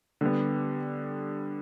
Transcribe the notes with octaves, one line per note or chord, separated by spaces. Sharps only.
D3 G3 B3